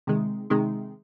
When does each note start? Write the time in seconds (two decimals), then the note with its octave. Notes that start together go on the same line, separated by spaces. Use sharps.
0.07 C3 D#3 G#3
0.50 C3 D#3 G#3